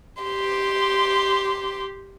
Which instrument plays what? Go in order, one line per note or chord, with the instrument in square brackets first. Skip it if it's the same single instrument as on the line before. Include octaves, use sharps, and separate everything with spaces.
[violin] G4 C6